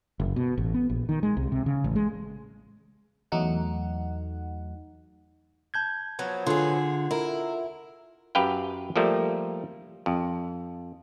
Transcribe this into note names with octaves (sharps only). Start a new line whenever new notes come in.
F#1
B2
A1
B3
A#1
D#3
G#3
C2
C3
C#3
A1
G#3
E2 F#3 A3 D#4 F#5
A5 G6 G#6
F3 F#3 B3
D3 F4 G#4 F#5 C6
E4 A#4
F#2 G4 B4 F5 G5
F3 G3 A3 A#3
F2